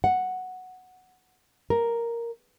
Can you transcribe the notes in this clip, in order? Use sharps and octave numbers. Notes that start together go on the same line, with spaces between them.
F#5
A#4